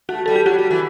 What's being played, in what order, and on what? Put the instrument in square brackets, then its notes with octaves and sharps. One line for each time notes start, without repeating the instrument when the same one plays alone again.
[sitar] A3 [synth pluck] F#4
[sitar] G3 [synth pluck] A4
[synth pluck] G4
[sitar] F#3 [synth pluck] F#4
[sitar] G3
E3